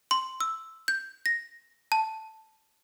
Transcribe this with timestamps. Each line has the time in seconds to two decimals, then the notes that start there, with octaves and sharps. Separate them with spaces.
0.11 C6
0.40 E6
0.88 G6
1.26 A#6
1.92 A5